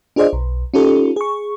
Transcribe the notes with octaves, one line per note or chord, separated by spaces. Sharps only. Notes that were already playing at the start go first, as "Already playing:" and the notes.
D4 F4 G#4 C5 D5 D#5
B1
C#4 D#4 F4 G4 A4
G#4 C#6